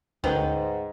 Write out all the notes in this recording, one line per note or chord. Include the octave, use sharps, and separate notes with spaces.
D2 G#2 D#3 C#4 B4 C5